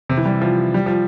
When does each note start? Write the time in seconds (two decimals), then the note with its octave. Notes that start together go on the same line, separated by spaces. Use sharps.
0.09 C3
0.17 E3
0.25 G3
0.41 F3
0.74 G3
0.86 F3